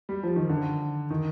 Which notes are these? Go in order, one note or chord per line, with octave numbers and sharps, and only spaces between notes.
G3
F3
D#3
D3
D#3